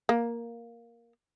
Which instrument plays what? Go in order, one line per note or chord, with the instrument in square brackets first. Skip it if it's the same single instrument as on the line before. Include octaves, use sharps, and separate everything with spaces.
[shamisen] A#3